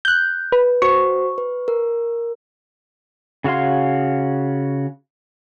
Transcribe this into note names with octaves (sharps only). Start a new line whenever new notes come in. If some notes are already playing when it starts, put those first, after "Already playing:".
F#6 G6
B4
F#4 C5 C#6
B4
A#4
C#3 F#4 C#5 F5 C6